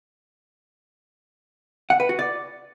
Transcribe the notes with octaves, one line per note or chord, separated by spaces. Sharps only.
F#5
B4
F#4
D5